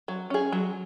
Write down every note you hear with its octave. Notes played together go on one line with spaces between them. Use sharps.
F#3
C#4 G#4
F#3